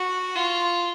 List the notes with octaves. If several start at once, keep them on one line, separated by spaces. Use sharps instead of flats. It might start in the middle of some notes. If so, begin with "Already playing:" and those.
Already playing: F#4
F4